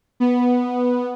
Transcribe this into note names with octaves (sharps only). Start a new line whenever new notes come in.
B3